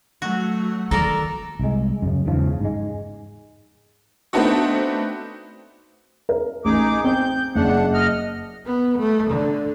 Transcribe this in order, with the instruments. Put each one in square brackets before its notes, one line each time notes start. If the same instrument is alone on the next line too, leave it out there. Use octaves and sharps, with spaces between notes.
[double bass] F#3 A3 [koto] F#4
[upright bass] D#3 E3 [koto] A4 A#4 D5 [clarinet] A#5
[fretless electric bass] C2 G#3
F#2 C#3
E2 G#2 C#3 F3
G#2 G#3
[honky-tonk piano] A3 B3 C4 D4 D#4 F#4
[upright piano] A#4
[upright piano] A1 [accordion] D#4 G#4 D6
[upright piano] C4 [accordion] G6
[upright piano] F#1 [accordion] D4 F#5
[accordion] D#5 F6
[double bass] B3
A3
D3